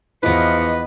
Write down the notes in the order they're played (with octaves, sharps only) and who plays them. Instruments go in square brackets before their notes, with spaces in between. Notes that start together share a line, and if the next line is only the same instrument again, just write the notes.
[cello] E2 [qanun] F3 B3 [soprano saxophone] B4 [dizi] D#5